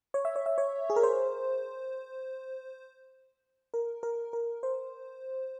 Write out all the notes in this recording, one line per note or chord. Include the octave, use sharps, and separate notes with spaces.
C#5
E5
C#5
E5
C#5
G#4
A#4
C5
A#4
A#4
A#4
C5